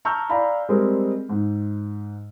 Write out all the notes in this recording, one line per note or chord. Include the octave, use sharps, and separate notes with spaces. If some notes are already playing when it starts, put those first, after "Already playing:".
A5 A#5 C#6 E6 F6 G6
D5 F5 G#5 A#5 B5
G3 G#3 C4 G#4 A#4
G#2